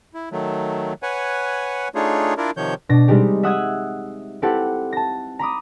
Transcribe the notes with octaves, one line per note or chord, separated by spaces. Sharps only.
E4
D#3 F#3 A3
B4 C#5 F#5 G#5
A3 D4 D#4 F4 G#4 C#5
D4 E4 F4 A#4 D5
C3 D#3 F3 C#5 G6
B2 D4 A#6
G3 G#3 C4 D#4 G4
E5 F#5 D#6 E6 F#6 G#6
C4 E4 G4 A4 B4 F#5
A5 A#6
A#5 B5 D6 D#6